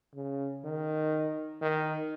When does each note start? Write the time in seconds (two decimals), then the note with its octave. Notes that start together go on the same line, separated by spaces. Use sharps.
0.15 C#3
0.64 D#3
1.62 D#3